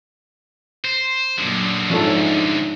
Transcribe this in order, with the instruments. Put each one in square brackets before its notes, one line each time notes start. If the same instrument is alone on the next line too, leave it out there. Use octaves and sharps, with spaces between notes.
[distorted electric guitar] C5
[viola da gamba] F#2 A#2 [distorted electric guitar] D3 G#3
[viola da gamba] G#2 D#4 E4 [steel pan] F3 C#4 A4